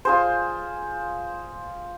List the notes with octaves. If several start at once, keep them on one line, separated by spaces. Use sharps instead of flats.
F4 G#4 C5